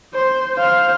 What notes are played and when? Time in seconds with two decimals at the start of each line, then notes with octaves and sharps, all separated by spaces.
0.14 C5
0.54 C5 F5